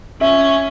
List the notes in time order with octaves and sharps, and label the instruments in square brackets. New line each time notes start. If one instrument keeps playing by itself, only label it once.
[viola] C#4 [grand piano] E5